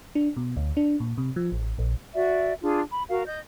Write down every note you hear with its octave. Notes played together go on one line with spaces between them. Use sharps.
D4
B2
D2
D4
A#2
C3
F3
A1
A#1
F#4 D5 E5
D4 F4 G#4
B5
F#4 A#4 F5
D#5 G6